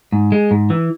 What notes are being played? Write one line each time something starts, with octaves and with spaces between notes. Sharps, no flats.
G#2
G#3
G#2
E3